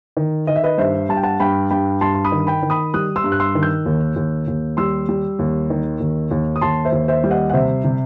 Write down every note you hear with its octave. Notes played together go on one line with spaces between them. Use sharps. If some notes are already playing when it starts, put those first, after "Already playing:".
D#3
D#3 D#5
E5
B4 D#5
G2 C5 E5
G2 A5
G5
F#5 A5
G2 G5 B5
G2 G5 B5
G2 A5 C6
C6
B5 D#6
D#3
G5 B5
D#3
B5 D#6
G3 D#6 F#6
C6 E6
G2
F#6
C6 E6
D#3
E6 G6
D#2
D#2
D#2
G3 C6 E6
G3
D#2
D#3
D#2
D#2
D#6
D#2 A5 C6
C5 E5
D#2
C5 E5
G3
D#5 F#5
F#5
C3 C5 E5
C3